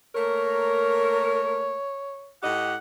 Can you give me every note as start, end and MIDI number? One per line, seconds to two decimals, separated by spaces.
0.15 1.80 57
0.15 1.80 58
0.15 1.80 70
0.15 2.32 73
2.43 2.75 45
2.43 2.75 67
2.43 2.75 75
2.43 2.77 78